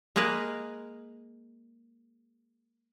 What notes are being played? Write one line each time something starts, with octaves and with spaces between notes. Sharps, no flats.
G#3 A#3 G#4 A#4 B4